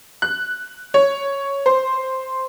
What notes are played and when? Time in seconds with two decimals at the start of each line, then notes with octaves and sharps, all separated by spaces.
0.22 F#6
0.94 C#5
1.66 C5